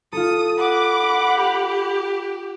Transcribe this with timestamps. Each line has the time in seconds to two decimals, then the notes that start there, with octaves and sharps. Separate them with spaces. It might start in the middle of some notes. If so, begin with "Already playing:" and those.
0.13 F4 A4 D#6
0.59 F#5 B5 D6
1.39 G4